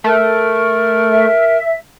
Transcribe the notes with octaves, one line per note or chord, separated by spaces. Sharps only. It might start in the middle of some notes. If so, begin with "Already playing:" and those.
A3 A#4
E5